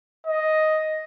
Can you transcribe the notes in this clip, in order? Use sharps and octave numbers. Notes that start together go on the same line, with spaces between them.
D#5